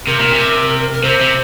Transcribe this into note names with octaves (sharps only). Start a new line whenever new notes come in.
C3 A#4
A#2
C3
A#4
C3 C5
C3